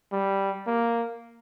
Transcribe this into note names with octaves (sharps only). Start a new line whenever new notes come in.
G3
A#3